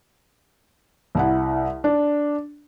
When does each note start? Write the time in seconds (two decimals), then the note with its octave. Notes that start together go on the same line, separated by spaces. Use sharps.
1.15 C2 E4 F#5
1.84 D4